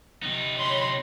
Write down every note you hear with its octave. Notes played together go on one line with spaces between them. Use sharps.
C3 D#4
C#5 B5 C6